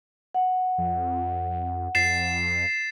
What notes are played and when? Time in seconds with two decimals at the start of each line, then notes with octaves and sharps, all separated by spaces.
0.35 F#5
0.78 F2
1.95 F2 A6 C7 E7